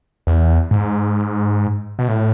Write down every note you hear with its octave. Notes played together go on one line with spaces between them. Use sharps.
E2
G#2
B2
A2